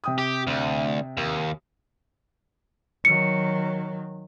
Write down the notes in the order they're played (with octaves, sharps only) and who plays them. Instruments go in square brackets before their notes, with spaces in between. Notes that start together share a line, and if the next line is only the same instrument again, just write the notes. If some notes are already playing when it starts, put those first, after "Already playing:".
[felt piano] C3 G5 D#6
[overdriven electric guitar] G4
D2
D#2
[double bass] D#3 F#3 [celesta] C#7